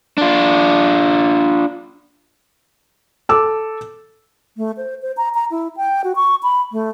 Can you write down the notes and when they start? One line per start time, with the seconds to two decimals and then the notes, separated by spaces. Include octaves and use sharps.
0.18 D4 F4
3.29 A4 D6 E6
4.57 A3
4.77 C5
5.02 C5
5.17 A#5
5.34 A#5
5.51 E4
5.77 G5
6.04 F#4
6.16 C#6
6.43 B5
6.72 A3